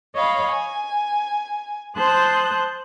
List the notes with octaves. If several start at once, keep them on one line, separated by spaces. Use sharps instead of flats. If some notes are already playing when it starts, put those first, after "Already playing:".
C#5 D#5 F5 B5
G#5
C5 A5 C6 D#6 F#6 G6